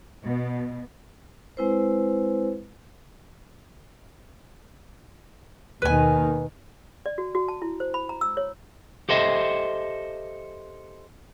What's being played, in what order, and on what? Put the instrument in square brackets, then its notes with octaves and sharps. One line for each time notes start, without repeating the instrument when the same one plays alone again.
[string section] B2
[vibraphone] G#3 C4 E4 B4 C5
[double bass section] D#2 B2 D#3 [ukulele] B4 G#5
[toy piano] D5
F#4
F#4
A5
E4
C5
B5
A#5
E6
C#5
[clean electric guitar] G4 A4 C5 D#5 E5